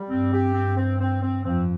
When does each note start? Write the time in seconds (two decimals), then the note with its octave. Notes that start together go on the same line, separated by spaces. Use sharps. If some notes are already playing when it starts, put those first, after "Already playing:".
Already playing: G3
0.09 G2 C4
0.32 G4
0.54 C4
0.77 C4
1.00 C4
1.22 C4
1.44 F2 C4